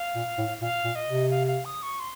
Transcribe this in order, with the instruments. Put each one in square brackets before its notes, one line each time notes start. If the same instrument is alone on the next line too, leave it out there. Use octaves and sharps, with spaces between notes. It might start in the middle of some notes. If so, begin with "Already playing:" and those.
Already playing: [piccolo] F5
[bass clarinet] A#2
A2
[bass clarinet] A#2 [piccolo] F5
[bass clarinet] A#2
[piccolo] D#5
[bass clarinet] C3
[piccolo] F5
F5
D#6
C#6
C6